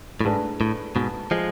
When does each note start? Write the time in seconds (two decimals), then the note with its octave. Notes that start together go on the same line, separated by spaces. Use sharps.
0.21 A2
0.25 G#2 A3 D4 G#4 B4
0.61 A2
0.96 G#2 B2
1.31 F3 G#3